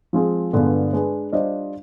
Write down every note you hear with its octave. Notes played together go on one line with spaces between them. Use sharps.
F3 G#3 C4 F4 G#4
G2 D3 G#3 B3 F4
G#3 D4 G#4 B4
G3 D4 F4 C5 D#5